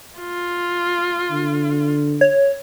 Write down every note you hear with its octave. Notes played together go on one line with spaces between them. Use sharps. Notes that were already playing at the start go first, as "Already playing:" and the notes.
F4
D3
C#5